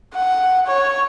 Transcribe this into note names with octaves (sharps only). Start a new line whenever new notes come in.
F#5
C#5